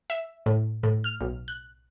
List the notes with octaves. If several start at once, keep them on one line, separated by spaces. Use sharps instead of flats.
E5
A2
A2
F6
B1
F#6